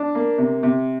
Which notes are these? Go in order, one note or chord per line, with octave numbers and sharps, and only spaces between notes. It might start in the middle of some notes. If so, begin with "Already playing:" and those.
Already playing: D4
A#3
C3
C3